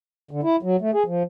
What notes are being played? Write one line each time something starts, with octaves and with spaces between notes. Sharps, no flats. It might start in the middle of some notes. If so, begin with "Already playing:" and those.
D3
E4
F#3
A3
G#4
F3